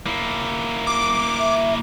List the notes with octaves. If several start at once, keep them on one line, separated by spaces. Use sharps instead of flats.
A#3 E4
D6
E5